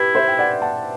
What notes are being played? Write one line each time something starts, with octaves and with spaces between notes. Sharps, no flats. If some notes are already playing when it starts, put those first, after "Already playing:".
Already playing: E4 G4 B4
C5 E5
G5
D5 F#5
F#5 A5